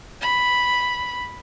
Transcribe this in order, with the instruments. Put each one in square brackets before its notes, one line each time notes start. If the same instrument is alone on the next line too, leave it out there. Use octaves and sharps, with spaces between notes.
[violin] B5